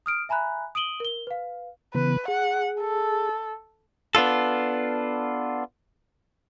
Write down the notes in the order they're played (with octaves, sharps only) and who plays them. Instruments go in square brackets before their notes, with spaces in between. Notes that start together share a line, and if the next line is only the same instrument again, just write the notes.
[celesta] D#6 F6 D7
E5 G#5 A#5 B5 F#6
D#6 D7 D#7 F#7 G7
A#4 G7
B4 F5
[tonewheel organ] C#3 E3 B3 [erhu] B4
[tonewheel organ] G#4 [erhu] F#5
[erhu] A4
[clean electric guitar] B3 D4 F4 A4